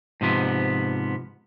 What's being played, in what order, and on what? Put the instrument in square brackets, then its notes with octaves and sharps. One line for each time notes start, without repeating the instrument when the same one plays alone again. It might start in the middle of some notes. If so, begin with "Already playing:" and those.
[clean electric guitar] G#2 C3 F3 B3